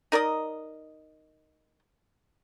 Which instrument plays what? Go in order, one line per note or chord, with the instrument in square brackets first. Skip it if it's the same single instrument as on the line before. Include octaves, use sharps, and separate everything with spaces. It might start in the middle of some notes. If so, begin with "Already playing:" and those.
[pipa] D#4 A#4 D5 D#5